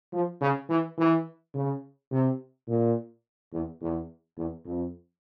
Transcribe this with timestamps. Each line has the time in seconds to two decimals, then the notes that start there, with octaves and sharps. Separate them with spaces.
0.13 F3
0.41 C#3
0.69 E3
0.98 E3
1.54 C#3
2.11 C3
2.68 A#2
3.52 E2
3.81 E2
4.37 E2
4.65 F2